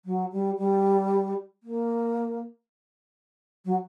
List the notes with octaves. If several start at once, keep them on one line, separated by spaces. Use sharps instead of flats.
F#3
G3
G3
A#3
F#3